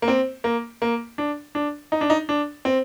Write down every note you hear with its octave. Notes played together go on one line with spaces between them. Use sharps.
A#3
C4
A#3
A#3
D4
D4
D#4
D4
D#4
D4
C4